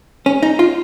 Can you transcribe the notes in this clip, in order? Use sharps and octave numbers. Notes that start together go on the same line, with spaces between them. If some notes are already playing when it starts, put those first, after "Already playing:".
C#4
D#4
F4